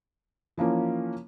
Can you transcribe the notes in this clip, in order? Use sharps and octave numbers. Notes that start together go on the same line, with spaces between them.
E3 F3 A#3 C#4